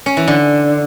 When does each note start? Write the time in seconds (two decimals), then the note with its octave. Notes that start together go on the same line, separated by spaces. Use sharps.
0.06 C#4
0.17 E3
0.28 D3